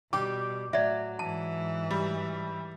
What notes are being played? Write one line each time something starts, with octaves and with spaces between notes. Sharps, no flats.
B2 G3 G4 D6
A2 F#3 D5 E5
G#2 E3 A5
G3